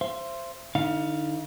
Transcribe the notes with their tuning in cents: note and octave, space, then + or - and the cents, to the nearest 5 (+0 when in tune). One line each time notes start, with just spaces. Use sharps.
C5 +0 E5 +40
D3 +30 D#4 +45 F5 +0